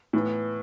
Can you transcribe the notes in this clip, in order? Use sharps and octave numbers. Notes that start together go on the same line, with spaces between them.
A2 E3 B3